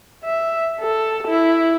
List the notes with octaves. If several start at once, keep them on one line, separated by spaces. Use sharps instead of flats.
E5
A4
E4